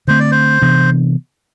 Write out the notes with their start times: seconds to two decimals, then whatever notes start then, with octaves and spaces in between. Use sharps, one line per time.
0.08 D3 A3 C4 C5
0.19 D5
0.31 C5
0.62 C3 E3 B3 D4